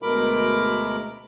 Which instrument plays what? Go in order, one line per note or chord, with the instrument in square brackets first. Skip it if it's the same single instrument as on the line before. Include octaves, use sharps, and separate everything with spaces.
[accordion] D2 B2 G#3 A#4 B5 D6